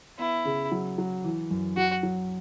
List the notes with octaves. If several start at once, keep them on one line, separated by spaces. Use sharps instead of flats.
B3 E4
C#3
F#3
F#3
E3
F#2
F#3 F#4
F#3